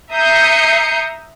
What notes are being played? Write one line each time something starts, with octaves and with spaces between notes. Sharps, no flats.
E5 A#5 D#6 G6 C7 C#7